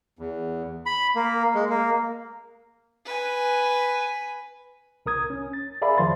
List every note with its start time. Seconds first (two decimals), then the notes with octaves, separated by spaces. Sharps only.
0.19 E2
0.86 B5
1.15 A#3
1.55 G#3
1.70 A#3
3.05 B4 G#5
5.06 C2 A#4 D#6 G#6
5.30 C#4
5.53 A6
5.82 G#4 A#4 D5 E5 F5 B5
5.98 F2 D#3 F3 C5 C6 A6